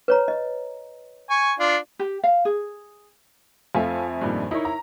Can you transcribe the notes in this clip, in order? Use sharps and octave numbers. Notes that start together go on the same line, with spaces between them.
B4 C#5 A#5
D#5
G#5 C#6
D4 F4
G4
F5
G#4
F2 A3 F4 A4 G#5
G2 A#2 D#3
D#4 E4 A#4 C#5
A#5